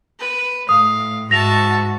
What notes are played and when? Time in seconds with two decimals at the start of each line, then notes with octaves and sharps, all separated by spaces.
0.19 B4
0.69 A2 F5 D#6
1.31 G#2 F#4 E5 A5 A#6 F7